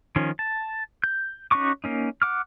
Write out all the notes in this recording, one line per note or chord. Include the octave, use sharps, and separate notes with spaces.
D#3 F3 C#4
A5
G6
C#4 D#4 F#4 C#6 D6
A#3 C#4 D#4
F#5 D6 F6